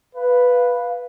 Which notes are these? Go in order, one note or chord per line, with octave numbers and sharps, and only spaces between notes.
B4 F5